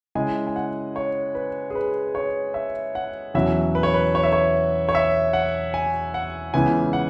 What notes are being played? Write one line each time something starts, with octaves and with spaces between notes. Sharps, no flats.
C#3 G#3 E4 G#5
G#5
F#5
C#5
B4
G#4
B4
C#5
E5
F#5
E2 B2 F#3 C#4 E4 E5
B4
C#5
B4
C#5
E5
C#5
C#5
E5
F#5
G#5
F#5
C#2 C#3 E3 B3 E4 G#5
F#5